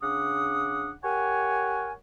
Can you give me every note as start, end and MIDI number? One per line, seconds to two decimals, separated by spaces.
0.03 0.91 49
0.03 0.91 62
0.03 0.91 78
0.03 0.91 86
0.03 0.91 87
1.04 1.93 67
1.04 1.93 70
1.04 1.93 73
1.04 1.93 78
1.04 1.93 80